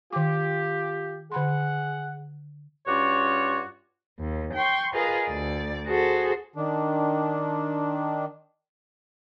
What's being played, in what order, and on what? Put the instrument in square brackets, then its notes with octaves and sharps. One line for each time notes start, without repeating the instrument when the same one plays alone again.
[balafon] D#3 D6 [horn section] F4 G4
[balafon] D3 B5 C6 [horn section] G#4 F#5
[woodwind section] G2 C#4 F4 F#4 C#5 D6
[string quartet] D#2
G5 C6 C#6
F4 G#4 A#4 B4 D#5 F5
D2 D5
F#4 G#4 A4 C5
[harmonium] D#3 D4